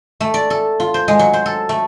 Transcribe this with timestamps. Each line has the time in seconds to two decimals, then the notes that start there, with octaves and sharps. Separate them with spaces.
0.20 A3
0.34 D5
0.50 A4
0.80 F4
0.94 C5
1.08 G#3
1.19 F#3
1.33 C5
1.46 A4
1.69 A3